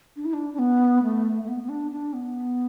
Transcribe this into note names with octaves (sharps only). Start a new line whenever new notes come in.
D4
E4
D4
D4
B3
A3
A3
B3
B3
D4
D4
B3